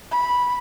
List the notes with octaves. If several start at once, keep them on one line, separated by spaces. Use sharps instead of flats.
B5